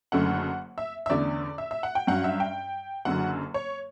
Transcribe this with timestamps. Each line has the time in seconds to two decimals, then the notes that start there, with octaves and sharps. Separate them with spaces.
0.12 F#1 F#2 D3 A3 C#4 F#5
0.78 E5
1.06 E5
1.09 E2 D3 A3 C#4 D5
1.58 E5
1.71 E5
1.83 F#5
1.95 G5
2.07 G2 F#3 C#4 F#5
2.24 E5
2.40 G5
3.05 F#1 F#2 D3 F#3 F#5
3.54 C#5